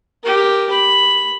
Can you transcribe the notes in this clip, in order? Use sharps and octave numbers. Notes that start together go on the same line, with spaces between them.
G4 A#4
B5